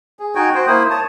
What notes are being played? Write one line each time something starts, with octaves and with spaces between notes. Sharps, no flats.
G#4
D#4 F#4 G5 G#5
F#4 C5 G5
A#3 E4 C5 D#6
C#5 A5 D#6